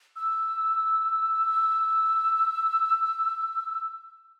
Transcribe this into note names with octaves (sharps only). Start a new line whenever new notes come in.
E6